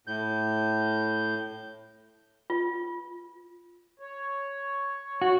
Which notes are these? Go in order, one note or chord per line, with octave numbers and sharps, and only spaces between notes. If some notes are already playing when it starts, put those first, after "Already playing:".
A2 G6
F4
C#5
F#4